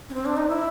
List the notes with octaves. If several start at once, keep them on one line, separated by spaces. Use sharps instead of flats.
C#4
C4
D4
D#4
E4